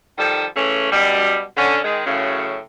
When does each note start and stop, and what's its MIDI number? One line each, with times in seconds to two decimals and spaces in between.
0.18 0.45 51
0.18 0.45 53
0.18 0.45 55
0.18 0.45 69
0.56 0.91 49
0.56 0.91 52
0.56 0.91 57
0.56 0.91 61
0.92 1.42 42
0.92 1.42 47
0.92 1.42 55
1.57 1.78 50
1.57 1.78 61
1.83 2.02 51
1.83 2.02 56
2.05 2.57 42
2.05 2.57 45
2.05 2.57 49